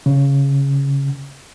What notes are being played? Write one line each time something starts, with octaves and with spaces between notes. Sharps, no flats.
C#3